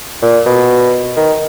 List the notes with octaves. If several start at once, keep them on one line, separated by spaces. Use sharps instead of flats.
A#2
B2
D#3